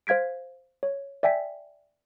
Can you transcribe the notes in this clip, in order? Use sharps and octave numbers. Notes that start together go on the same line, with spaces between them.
C5 F5 G#6 B6 D7
C#5
D5 E5 G5 G#5 B6